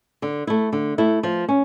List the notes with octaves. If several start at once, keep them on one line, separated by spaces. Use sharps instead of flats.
D3
A3 E4
D3
A3 E4
F3
C#4